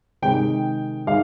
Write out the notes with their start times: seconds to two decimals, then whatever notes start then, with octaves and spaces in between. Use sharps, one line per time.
0.22 C3 D#3 G#3 G5
1.07 D#3 G#3 F5